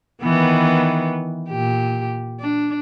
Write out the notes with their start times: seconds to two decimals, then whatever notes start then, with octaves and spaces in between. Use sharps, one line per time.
0.21 D#3 E3 B3
1.48 A#2 G4
2.40 D4